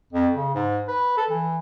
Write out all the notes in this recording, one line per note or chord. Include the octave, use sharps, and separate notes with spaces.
F2
C#3
G#2
B4
A4
E3